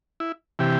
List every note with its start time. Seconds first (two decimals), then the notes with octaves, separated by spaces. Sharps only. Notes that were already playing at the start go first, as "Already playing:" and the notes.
0.20 E4
0.59 C3 E3 G4